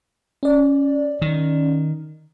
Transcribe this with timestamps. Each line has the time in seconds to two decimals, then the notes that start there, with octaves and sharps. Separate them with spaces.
0.43 C#4 D5
1.22 D#3